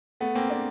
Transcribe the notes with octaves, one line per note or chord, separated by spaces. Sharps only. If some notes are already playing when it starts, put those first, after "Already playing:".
A3 B3
A#3 C4
C4 D4